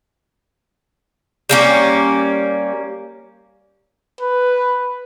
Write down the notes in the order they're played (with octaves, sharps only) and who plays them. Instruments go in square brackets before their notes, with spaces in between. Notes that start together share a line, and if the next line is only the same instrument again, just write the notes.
[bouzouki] G3 A#3 C#4
[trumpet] B4